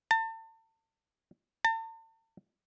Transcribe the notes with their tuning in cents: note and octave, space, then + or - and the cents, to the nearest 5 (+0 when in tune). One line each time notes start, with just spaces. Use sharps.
A5 +35
A5 +40